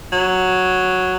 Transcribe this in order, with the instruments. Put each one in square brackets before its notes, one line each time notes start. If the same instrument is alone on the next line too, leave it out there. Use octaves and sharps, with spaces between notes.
[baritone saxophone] F#3